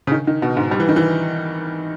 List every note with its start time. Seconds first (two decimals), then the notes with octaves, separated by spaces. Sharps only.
0.07 C#3
0.12 D#3
0.27 D#3
0.42 B2
0.57 G#2
0.71 G3
0.80 E3
0.89 D#3
0.96 E3